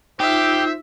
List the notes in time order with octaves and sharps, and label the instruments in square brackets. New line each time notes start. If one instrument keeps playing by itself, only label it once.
[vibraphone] D#4 F4 [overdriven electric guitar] G4 [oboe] C5 [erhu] E5